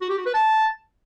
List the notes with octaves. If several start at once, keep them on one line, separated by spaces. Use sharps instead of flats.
F#4
G4
F#4
B4
A5